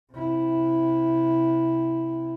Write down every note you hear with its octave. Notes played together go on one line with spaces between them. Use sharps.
C3 E4